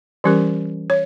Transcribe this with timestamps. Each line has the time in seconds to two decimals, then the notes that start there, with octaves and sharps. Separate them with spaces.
0.24 E3 G3 C#4 G4 A#4
0.90 C#5